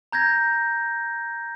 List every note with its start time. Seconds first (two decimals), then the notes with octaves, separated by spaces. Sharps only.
0.12 A#5 G6 G#6 A#6